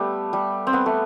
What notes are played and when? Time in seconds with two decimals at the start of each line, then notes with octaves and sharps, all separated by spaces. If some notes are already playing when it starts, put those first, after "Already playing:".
Already playing: G3 A3 B3
0.33 G3
0.67 C4
0.73 B3
0.86 A3